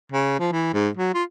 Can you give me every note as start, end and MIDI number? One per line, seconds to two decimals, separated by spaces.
0.12 0.37 49
0.39 0.50 53
0.52 0.73 52
0.74 0.89 44
0.97 1.13 54
1.14 1.23 65